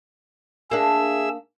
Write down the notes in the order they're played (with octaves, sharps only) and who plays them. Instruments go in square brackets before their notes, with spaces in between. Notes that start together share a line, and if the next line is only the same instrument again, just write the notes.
[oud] A#3 D4 [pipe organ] G#4 E5 E6